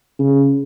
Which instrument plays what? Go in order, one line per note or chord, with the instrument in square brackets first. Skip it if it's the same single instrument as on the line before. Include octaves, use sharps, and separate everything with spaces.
[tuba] C#3